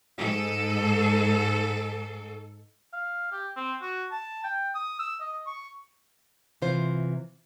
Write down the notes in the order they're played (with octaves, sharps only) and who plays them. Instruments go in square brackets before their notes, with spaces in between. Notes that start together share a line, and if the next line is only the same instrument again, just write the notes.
[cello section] G#2 A4
[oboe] F5
G4
C4
F#4
A5
G5
D#6
E6
D#5
C#6
[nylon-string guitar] C3 E3 F4 C5